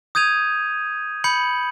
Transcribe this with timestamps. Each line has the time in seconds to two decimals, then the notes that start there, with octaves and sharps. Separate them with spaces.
0.15 D#6 G6 G#6 D#7 F7
1.24 B5 G6 C#7 F#7